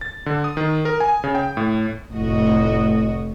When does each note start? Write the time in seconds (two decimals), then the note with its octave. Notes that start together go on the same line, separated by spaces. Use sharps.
0.01 A6
0.26 D3
0.44 D#6
0.57 D#3
0.85 A#4
1.00 G#5
1.24 C#3
1.35 G5
1.57 A2
2.12 F1 F2 A2 F#4 D#5